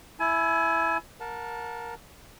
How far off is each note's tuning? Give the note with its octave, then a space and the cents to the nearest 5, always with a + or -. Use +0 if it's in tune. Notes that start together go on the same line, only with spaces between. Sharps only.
E4 +5 G#5 +35
A#4 +5 F#5 -35 A5 +0